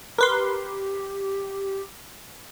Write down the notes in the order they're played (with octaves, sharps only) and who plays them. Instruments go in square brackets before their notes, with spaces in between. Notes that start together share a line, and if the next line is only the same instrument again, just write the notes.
[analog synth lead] G4 [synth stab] A#4 B4 C6